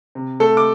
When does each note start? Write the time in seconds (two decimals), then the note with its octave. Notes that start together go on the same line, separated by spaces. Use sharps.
0.15 C3
0.40 A3 A4
0.57 D6